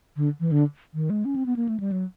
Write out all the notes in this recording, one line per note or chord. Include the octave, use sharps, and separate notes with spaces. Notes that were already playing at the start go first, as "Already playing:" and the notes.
D3
E3
D3
D#3
G#3
C#4
C4
B3
A#3
A3
G3
F#3